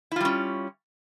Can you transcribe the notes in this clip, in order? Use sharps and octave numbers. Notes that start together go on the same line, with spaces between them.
G3 C#4 E4 F4